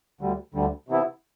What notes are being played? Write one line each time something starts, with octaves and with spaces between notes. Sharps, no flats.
D2 D3 G3
D2 D3 G3
C3 E3 B3 E4